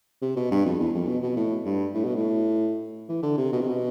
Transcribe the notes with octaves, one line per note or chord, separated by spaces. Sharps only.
C3
B2
G2
F2
E2
F2
B2
B2
A2
G2
A2
B2
A2
E3
D3
C3
B2
C3
B2